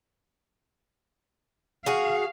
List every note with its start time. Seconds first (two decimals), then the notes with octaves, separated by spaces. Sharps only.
1.86 F#4 G#4 F5